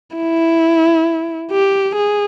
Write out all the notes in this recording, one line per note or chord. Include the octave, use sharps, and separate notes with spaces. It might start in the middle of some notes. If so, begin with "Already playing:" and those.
E4
G4
G#4